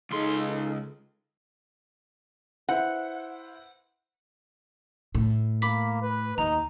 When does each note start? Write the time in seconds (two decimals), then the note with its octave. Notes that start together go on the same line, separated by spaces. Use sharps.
0.11 C#2 D#4 G#4 A4 C6
2.69 E4 B4 C5 F#5
5.15 A2
5.62 A#3 B5 D6 B6
6.02 B4
6.38 D#2 D#4 A#5